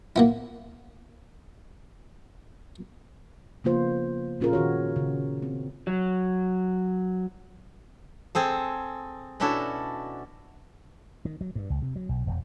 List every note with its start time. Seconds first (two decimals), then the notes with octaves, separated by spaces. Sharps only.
0.16 A#3 B3 E4
3.64 C#3 F3 A#3 B3 F4 C5
4.40 A#2 C#4 F4 G#4 A#4
4.53 D#3 F#4 C#5
4.96 C#3
5.42 C4
5.87 F#3
8.35 C4 G#4 A4
9.40 B2 C#4 D4 E4 F#4 A4
11.25 D#3
11.41 F#3
11.55 G2
11.70 C#2
11.82 C3
11.96 F#3
12.09 B1
12.27 E1